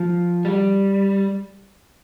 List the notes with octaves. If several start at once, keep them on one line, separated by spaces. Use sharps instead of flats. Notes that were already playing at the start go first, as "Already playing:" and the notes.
Already playing: F3
G3